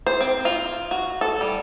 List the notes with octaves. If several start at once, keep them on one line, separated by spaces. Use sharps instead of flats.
C5
C4
F4
F#4
A4
G3